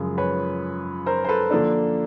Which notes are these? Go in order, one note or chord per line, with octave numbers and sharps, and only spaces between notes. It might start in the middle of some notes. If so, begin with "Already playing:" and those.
Already playing: F#2 C#3 F3 G#3
B4 C#5
A#4 C5
C5
A4 B4
D3 F3 A#3 D4 A4